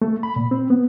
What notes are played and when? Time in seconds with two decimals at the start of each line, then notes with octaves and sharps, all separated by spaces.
0.02 A3
0.23 B5
0.36 A#2
0.51 C4
0.70 B3